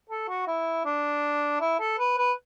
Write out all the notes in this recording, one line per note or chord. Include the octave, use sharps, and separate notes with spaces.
A4
F#4
E4
D4
E4
A4
B4
B4